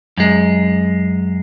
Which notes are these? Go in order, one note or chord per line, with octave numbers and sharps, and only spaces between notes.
F#2 G#3